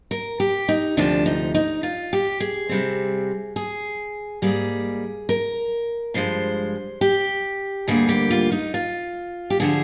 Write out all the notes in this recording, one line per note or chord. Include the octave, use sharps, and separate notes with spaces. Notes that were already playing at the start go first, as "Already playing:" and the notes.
A#4
G4
D#4
D2 C3 F3 D4
D#4
D#4
F4
G4
G#4
C3 G3 C4
G#4
G#2 G3 A#3 G#4
A#4
G2 F3 G#3 C5
G4
D2 D3 G3 A#3 G#4
G4
F4
D#4
F4
G4
D3 F3 G#4